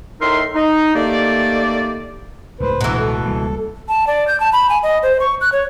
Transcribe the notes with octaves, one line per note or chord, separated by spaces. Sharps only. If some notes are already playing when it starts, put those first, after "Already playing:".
A2 D#3 D#4 A#4 E5 C6
D#4
D#3 A3 A#3 G4 D5
C#2 A2 G#3 B4 C5
G2 B2 E3 A#5
A4
C#2 G3 A#3
A5
D5
G6
A5
B5
G#5
D#5
C5
C#6
F#6
C#5